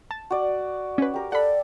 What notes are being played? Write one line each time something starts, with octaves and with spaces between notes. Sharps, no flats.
A5
F#4 D5
C#4 B4
G4 A#4
A4 D5 F#5 B5